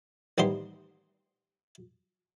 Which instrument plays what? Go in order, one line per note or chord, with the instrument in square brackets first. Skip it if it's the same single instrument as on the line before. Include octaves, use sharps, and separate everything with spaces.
[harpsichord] A1 D#2 G3 B3 C5 C6